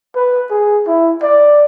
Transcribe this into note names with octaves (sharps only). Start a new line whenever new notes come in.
B4
G#4
E4
D5